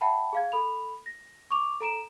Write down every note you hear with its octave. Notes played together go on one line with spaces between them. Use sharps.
E5 F#5 G5 A5 B5
G#4 F5 G#6
A4 B5 F7
A#6
C#6 D6 F7
A4 A#5 D7 E7